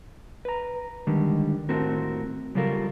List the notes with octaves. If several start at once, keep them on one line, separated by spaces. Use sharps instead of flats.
B4 A#5
D3 D#3 G3 G#3
D#2 A2 A3 C4 F#4 A#4
C#3 F#3 G3 F4 A4 A#4